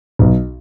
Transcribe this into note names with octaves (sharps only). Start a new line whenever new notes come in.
B1